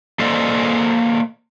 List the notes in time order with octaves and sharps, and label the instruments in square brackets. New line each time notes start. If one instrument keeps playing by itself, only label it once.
[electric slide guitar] A#3 A4 C5 D5 D#5